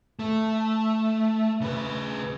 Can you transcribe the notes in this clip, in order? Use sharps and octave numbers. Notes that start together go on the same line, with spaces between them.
A3
C#3 B4